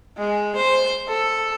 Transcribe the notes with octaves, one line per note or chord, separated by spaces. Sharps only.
G#3
C5
A4